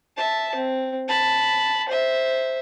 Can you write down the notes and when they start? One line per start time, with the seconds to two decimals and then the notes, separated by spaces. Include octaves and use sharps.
0.17 E5 A5
0.55 C4
1.08 A5 B5
1.89 C5 E5